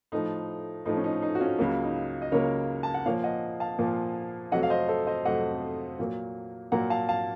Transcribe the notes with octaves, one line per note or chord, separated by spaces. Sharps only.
A2 F3 A3 D#4
A2 F3 A3 D#4
C#4
D#4
D#4
F#4
C#4 F4
C#2 C#3 F#3 A#3
D#4
D#5
C#2 C#3 F#3 A#3 A#4 C#5
A5
F#5
A#2 F3 A#3 C#5 F5
D#5 F#5
F5 A5
A#2 F3 A#3
F2 C3 F#3 A3 D#5 F#5
F5
C5 D#5
A4 C5
C5 D#5
F2 C3 F#3 A3 D#5 F#5
A#2 F#3 A#3
A#2 F#3 A#3 F#5 A#5
F5 A5
F5 A5